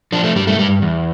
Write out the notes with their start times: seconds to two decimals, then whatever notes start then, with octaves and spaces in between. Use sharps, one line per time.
0.12 F3 D4
0.24 A3
0.36 G2 G3
0.47 A3
0.59 G2 G3
0.82 E2